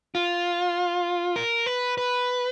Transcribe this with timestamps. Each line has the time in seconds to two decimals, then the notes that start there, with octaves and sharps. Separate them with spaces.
0.15 F4
1.36 A#4
1.66 B4
1.98 B4